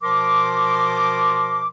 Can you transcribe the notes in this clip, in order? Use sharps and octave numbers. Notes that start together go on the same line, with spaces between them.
B2 F3 A#4 C6 D6